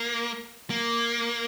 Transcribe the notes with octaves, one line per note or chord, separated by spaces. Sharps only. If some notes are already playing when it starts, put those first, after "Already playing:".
Already playing: A#3
A#3